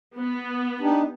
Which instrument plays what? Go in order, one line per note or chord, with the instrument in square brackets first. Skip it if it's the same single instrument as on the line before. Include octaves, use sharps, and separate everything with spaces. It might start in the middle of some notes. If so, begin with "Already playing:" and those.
[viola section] B3
[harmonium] D4 D#4 G4